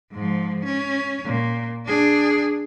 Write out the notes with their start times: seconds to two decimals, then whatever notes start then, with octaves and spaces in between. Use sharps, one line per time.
0.12 G#2 F3
0.64 C#4
1.25 A#2
1.86 D4 G#4